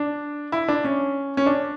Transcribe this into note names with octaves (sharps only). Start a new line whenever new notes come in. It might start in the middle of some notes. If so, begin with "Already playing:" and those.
Already playing: D4
E4
D4
C#4
C#4
D4